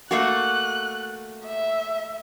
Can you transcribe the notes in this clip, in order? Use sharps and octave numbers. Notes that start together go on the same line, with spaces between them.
A3 A#3 F#4 F#6
E5